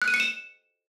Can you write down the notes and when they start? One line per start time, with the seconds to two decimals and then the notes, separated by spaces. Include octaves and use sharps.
0.02 F#6
0.08 D#7
0.14 C#7
0.20 E7